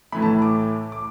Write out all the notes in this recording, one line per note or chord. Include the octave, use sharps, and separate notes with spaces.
A2 E3 A3 B5
A5
D6
D6